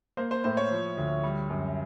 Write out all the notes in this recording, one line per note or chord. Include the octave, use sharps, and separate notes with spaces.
A#3 C5
C5
A2 C5
C#5
F3
D2
G3
F#2